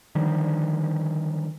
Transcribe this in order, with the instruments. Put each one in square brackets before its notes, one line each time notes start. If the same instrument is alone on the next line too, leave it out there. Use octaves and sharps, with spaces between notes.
[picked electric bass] D3 D#3 F3 G3